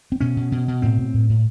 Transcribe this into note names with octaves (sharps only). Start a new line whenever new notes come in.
C4
B2 C#4
B2
B2
B2
A2 C4
A2
A2
A2